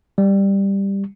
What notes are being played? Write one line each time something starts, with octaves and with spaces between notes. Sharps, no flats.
G3